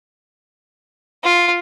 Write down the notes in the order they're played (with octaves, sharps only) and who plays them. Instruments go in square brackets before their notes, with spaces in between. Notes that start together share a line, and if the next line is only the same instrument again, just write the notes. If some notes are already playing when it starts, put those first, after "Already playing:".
[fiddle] F4